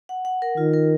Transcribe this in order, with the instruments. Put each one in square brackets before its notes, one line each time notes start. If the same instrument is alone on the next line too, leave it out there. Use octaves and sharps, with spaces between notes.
[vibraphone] F#5
F#5
A#4
[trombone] D#3 [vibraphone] F4
[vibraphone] A#4